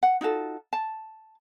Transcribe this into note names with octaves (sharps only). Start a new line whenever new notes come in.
F#5
D#4 F4 F#4 A4
A5